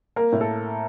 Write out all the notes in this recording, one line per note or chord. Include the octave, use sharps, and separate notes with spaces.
A#3 A#4
A2
A4